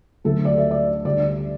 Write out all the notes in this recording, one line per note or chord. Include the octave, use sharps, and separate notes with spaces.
D2 D3 F#3 A3 A4
D5
E5
D5
D2 D3 G3 D5